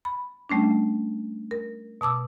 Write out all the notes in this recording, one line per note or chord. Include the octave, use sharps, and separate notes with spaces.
B5
G3 A3 C#4 D4
A#4
B2 A5 D6 E6